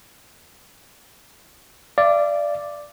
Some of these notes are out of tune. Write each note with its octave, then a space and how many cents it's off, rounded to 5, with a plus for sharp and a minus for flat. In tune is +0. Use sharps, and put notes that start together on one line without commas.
D5 +0 F5 -45